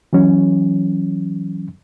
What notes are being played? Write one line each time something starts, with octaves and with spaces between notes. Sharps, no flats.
E3 F#3 C#4